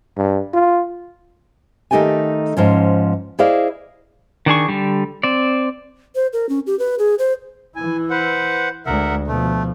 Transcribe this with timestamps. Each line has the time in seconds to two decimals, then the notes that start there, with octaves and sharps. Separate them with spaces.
0.18 G2
0.54 F4
1.91 D#3 A3 D#4 G4 A4 G#5
2.57 G#2 F3 C#4
3.39 E4 G#4 C5 D5 D#5 F5
4.46 D#3 D4 G#4 C#6
4.69 D3 G3
5.23 C4 D5
6.15 C5
6.33 A#4
6.49 C#4
6.67 G4
6.79 B4
6.99 G#4
7.19 C5
7.76 E3 E4 G#5
8.10 B4 C5 F#5
8.86 D2 G#3 A#4 E5 F#5
9.28 B2 F3 A3